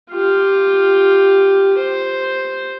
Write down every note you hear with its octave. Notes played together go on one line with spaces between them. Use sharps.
F4 G4
C5